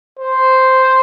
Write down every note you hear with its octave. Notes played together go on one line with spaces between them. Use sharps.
C5